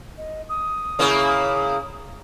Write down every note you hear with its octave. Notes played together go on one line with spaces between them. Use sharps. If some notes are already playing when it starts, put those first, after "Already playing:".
D#5
D#6
C#3 A#3 E4